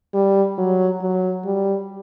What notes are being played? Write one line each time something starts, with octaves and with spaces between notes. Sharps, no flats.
G3
F#3
F#3
G3